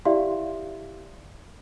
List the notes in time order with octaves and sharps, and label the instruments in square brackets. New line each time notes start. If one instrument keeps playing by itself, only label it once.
[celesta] E4 G4 D5 E5 F5 C6